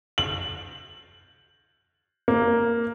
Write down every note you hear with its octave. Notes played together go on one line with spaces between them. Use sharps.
F#7
A#3